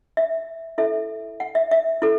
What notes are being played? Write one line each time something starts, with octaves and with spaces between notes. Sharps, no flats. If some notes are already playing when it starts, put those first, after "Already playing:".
E5
E4 A4 E5
F#5
E5
E5
E4 A4